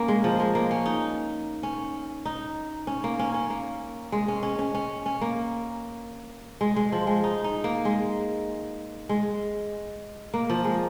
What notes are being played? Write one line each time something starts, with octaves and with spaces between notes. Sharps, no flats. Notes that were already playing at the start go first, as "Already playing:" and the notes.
Already playing: A#3 C#4
G#3
F3
G#3
A#3
C#4
D#4
C#4
D#4
C#4
A#3
C#4
C#4
A#3
G#3
C#4
C#4
C#4
C#4
C#4
A#3
G#3
G#3
F3
G#3
D#4
D#4
A#3
G#3
G#3
A#3
F3
G#3